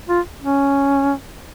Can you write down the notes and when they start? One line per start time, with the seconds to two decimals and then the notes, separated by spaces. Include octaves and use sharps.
0.09 F4
0.42 C#4